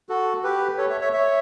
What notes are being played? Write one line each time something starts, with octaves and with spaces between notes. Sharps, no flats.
F#4 A4
G4 B4
A4 C#5
C#5 E5
C#5 E5
C#5 E5